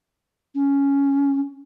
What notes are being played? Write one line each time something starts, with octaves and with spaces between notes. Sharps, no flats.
C#4